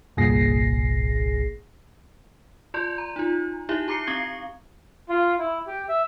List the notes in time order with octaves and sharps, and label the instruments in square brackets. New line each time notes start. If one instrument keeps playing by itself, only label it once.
[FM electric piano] G1 C2 A#2 G#4 A#6 C7
[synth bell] F4 D5 A5 C6 G6
A#5
D#4 F4
D#4 E4 G4 E5
G4 A#5 D6 C7 C#7
C4 F5 C#6 G#6 G7
[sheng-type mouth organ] F4
E4
G4
E5